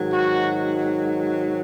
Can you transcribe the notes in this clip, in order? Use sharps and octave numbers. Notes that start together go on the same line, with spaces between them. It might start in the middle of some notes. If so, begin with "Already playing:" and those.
Already playing: G#2 D#3 F#3
F#4